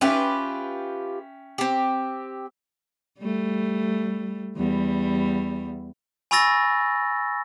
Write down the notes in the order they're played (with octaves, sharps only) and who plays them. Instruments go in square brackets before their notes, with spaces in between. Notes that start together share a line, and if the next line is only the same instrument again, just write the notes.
[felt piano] C#4 E5 G5 [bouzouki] F4 G4 B4
[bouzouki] C4 G4
[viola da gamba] G3 A3
E2 G3
[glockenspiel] G#5 B5 C#6 E6 A6 A#6